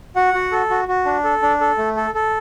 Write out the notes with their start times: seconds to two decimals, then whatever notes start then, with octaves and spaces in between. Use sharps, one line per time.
0.16 F#4 F#5
0.34 F#4
0.52 A4
0.70 F#4
0.88 F#4
1.06 D4
1.24 A4
1.42 D4
1.61 A4
1.78 A3
1.97 A4
2.15 A4